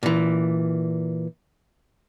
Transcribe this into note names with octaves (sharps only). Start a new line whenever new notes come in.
A#2 E3